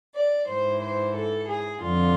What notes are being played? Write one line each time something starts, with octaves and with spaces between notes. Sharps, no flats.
D5
G#2 E3 C5
C5
A4
G#4
F2 D3 F4